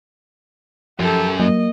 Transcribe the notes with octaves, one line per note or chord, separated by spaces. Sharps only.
F#2 F3 G4 A4
F#3 A#3 D#5